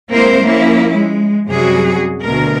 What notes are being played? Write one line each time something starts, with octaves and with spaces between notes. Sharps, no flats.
G#3 A#3 C4 E4 A#4 C5
F3 A#3 C#4 E4
G#3
F#2 C3 F#3 G3 F#4 G#4
D2 B2 A#4